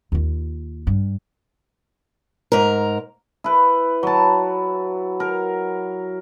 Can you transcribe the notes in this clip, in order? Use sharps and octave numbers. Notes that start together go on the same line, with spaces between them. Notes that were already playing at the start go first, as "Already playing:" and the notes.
D#2 F4
G2
G#2 A#4
E4 B4
F#3 A5
A#4